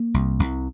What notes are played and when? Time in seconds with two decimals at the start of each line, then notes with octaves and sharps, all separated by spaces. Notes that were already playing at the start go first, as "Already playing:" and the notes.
Already playing: A#3
0.14 C2
0.40 C2